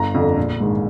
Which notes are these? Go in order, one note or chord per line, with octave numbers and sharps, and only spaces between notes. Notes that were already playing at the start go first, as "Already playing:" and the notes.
Already playing: G1 A#5
F2 D3
A#1
G#2 D#3